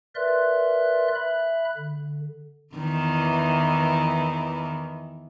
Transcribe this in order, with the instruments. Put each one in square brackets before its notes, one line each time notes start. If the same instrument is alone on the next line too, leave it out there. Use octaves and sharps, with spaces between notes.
[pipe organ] A#4 B4 D5 E5 C6 F#6
E5 B5 F#6
D3
[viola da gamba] E2 D#3 E3